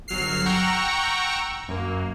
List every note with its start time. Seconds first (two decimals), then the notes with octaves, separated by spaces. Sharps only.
0.08 G1 F#3 F6 C7
0.46 F#5 G5 A#5 C#6 E6
1.68 F#2 A#3